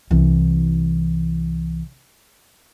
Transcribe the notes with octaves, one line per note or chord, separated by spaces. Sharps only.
C2 E3